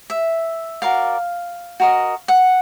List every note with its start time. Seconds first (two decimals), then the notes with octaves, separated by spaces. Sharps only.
0.10 E5
0.82 F#4 A#4 D5 F5
1.80 F#4 A#4 D#5
2.28 F#5